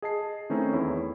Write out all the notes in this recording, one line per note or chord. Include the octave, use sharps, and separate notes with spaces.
G#4 D#5 A5 C7
D#3 A3 C4 C#4 D#4 E4
E2 E4 C#5